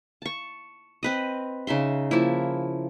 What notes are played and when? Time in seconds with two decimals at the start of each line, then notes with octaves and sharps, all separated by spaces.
0.22 A5 C#6
1.03 C4 B4 D#5
1.67 C#3 D#4 E5 C6
2.11 F3 A#3 E4